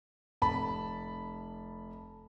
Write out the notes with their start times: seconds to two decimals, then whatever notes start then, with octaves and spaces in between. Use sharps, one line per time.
0.42 F1 A5 B5